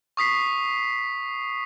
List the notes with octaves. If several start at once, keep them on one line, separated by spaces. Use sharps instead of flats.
C#6 D#6 B6 C7